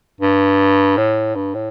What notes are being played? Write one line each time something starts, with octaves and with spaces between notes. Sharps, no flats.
G2
A2
G2
A2